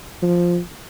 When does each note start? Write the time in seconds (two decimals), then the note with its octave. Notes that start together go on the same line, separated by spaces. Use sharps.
0.22 F3